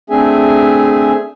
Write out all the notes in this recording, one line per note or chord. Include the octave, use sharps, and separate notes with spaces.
A3 C4 D4 G#4 E5 G#5